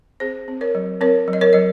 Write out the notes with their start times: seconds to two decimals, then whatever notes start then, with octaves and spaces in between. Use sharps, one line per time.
0.20 C4 G#4 C5
0.48 C4
0.61 A#4 C#5
0.75 F#3
1.01 C4 A#4 C#5
1.28 F#3
1.33 D#5
1.41 A#4 C#5
1.53 F#3 D#5